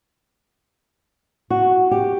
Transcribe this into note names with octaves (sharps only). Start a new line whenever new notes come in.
F#4
G4